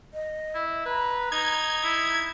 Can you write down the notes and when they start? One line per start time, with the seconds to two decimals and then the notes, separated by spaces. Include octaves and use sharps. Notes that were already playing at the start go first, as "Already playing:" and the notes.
0.14 D#5
0.55 E4
0.86 B4 A#5
1.32 D#4 G#6
1.84 E4